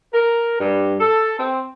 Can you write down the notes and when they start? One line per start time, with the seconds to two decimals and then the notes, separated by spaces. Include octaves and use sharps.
0.13 A#4
0.60 G2
1.00 A4
1.38 C4